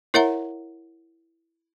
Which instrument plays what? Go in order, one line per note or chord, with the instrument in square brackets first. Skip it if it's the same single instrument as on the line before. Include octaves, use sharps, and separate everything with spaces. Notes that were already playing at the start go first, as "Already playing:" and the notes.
[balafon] E4 A#4 C#5 E5 F#5 A#5